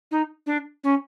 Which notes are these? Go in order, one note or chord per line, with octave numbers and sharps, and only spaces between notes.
D#4
D4
C#4